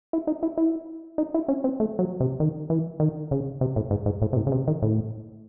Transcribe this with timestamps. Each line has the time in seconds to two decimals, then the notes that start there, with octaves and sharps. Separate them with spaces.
0.13 E4
0.27 D#4
0.43 E4
0.57 E4
1.18 D#4
1.34 E4
1.48 C#4
1.64 C4
1.80 A3
1.99 F#3
2.20 C3
2.40 D#3
2.70 E3
3.00 D#3
3.31 C#3
3.61 C3
3.76 A2
3.91 G#2
4.06 G#2
4.22 A2
4.33 C3
4.37 A2
4.47 C#3
4.52 C3
4.68 D#3
4.82 A2